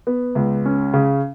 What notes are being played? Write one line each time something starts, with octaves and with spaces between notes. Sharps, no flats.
B3
C#2
C#4
C#3